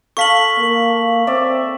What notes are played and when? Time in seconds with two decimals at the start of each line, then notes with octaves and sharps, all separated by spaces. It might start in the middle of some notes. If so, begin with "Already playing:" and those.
0.17 A4 F5 C#6 B6 F#7
0.58 A#3
1.27 C4 D5 E5